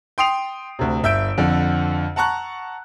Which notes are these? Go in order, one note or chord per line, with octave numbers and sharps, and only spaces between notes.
G5 C6 D#6 C7 F7
D2 C3
G1 E5 E6 G6 D7
F2 D3
F#5 A5 A#5 C#6 F#6